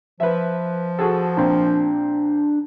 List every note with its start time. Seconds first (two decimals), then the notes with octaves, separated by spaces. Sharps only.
0.20 F3 B4 E5
0.99 F#4 G#4 A4
1.37 A#2 C4 D4